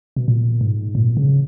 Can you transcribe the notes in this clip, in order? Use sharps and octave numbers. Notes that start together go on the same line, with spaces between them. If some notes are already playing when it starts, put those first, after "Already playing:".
B2
A#2
G#2
A#2
C#3